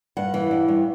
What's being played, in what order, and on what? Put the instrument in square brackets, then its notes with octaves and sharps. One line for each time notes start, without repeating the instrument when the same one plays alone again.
[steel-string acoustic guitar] G2 F#5
E3
G2
G2